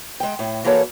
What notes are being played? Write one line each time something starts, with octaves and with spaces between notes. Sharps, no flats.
G#3 G5
A2
E3 A#3 F#4 A4 A#4 C#5